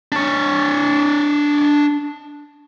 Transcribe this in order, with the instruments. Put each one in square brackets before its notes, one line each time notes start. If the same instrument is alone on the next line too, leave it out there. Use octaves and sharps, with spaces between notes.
[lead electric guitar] D4 C#5